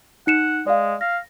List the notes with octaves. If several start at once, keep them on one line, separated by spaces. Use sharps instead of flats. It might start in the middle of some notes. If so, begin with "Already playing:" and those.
D#4 F#5 C#7 E7
G#3 D5 F5
F5 A#6